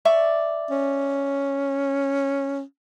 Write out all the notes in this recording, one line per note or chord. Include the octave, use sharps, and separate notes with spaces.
D5 E5 C#6
C#4